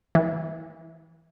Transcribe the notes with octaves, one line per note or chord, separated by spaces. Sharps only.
E3